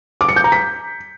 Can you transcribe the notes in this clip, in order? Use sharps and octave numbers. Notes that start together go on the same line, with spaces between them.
D6
C#7
G6
A#5
B6